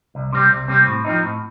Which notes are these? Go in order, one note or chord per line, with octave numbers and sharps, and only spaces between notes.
C2
C3 G3 C4
C2
C3 G3 C4
A2
F3 C4 D#4
A2